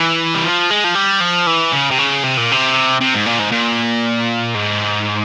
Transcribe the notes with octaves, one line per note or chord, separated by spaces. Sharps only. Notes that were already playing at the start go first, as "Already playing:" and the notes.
Already playing: E3
G3
F3
G#3
F3
G3
F3
E3
C#3
C3
C#3
C3
A#2
C3
C3
G#2
A#2
G#2
A#2
G#2